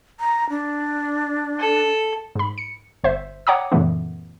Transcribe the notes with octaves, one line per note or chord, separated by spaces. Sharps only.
A#5
D4
A4
G#2 B5
C#7
G1 C5 E5
C#5 F#5 G5 A#5 D6 D#6
F#2 A#2 C#3 E3 A3 B3